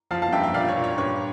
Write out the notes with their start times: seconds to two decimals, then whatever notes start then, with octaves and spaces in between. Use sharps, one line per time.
0.11 F3 F5 A5
0.22 F5 A5
0.32 G2 E5 G5
0.43 E5 G5
0.54 A#2 D5 F5
0.68 C#5
0.77 A#2
0.84 C#5
0.98 G2 C#5